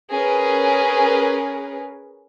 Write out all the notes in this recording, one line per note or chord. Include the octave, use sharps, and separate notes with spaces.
C#4 G#4 A#4 B4